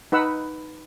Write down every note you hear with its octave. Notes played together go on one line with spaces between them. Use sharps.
D#4 B4 F#5 E6